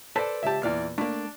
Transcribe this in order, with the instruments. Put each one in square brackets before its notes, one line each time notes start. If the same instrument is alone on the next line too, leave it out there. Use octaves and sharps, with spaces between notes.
[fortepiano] A4 D5 [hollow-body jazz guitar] B4 C5 A5
[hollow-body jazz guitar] C#2 G4 [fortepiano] E5 A5
[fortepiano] E2 D5 F6 [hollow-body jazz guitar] A#2
[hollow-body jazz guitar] A3 A#3 [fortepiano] D4 D5